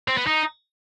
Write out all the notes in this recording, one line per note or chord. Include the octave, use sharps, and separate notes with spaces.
C4
B3
D#4